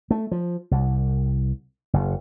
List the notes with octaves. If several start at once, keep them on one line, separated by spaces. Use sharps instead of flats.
A3
F3
C2
F#1